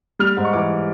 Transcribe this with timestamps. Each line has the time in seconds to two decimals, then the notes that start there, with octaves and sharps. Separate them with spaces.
0.19 G3 F6
0.37 G#2
0.45 C#6
0.53 E3 D6